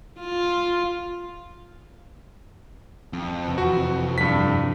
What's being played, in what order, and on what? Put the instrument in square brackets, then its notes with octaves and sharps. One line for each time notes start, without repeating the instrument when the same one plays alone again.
[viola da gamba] F4
[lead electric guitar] F2
[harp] E2 C3 C4
[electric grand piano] F#4
G2 B6